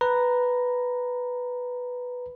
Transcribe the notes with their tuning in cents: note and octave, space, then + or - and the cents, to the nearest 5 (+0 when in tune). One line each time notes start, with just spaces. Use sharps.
B4 +0 A#5 +0